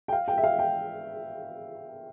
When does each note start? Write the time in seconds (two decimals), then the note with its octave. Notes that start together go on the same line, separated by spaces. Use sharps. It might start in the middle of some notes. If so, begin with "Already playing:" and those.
0.08 G5
0.13 F5
0.28 G5
0.38 E5
0.44 F5
0.59 G5